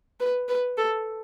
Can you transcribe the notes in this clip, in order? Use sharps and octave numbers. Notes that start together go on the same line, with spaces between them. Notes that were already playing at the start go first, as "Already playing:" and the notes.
B4
B4
A4